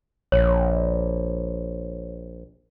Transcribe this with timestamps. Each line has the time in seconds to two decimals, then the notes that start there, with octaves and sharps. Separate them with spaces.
0.32 A#1 C#5